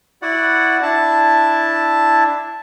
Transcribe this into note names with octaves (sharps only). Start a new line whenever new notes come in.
E4 F#4 D5 F#5
D4 E4 E5 A5